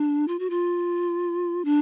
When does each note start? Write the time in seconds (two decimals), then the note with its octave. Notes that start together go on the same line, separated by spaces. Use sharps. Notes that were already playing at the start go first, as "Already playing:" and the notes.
Already playing: D4
0.28 F4
0.39 F#4
0.50 F4
1.65 D4